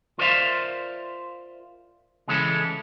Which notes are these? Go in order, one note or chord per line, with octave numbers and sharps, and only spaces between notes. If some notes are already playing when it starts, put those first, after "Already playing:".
F4 A#4 C5 D5 E5 F5
C#3 E3 G#3 C#4 E4 A4